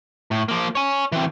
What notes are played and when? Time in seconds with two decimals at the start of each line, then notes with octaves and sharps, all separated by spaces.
0.31 A2
0.48 F3 A#3
0.75 C#5 G#5
1.12 E3 C4